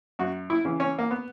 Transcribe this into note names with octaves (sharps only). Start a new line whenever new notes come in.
F#2 F#4
E4
C#3 E3
C#4
A#3
B3